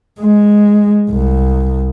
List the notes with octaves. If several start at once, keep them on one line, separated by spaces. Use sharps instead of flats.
G#3
C2